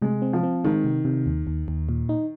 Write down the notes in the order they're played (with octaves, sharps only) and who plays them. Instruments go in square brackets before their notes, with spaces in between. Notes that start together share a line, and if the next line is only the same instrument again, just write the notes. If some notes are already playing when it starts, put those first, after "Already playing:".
[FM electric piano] C3 [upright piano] G#3
[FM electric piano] C4
[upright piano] F3
[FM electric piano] C4
[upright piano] D#3 [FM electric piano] G#3
[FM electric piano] C3
C3
D#2
D#2
D#2
A#2
D#4